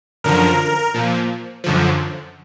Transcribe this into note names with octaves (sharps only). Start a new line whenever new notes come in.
F#2 D3 F3 A#4
A#2 F3
F#2 D3 F3